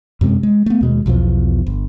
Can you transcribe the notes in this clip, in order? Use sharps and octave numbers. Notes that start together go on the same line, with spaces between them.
F#2 C3 G#3 C4
G#3
A3 B3
D#2 B2 G#3
B1 E2 B2 F3
G1